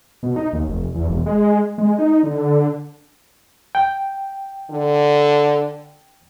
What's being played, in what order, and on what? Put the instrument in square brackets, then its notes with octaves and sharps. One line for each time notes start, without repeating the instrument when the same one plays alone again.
[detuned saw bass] B2
D#4
D#2
F1
E2
E1
G#3
G#3
D#4
D3
[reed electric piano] G5
[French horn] D3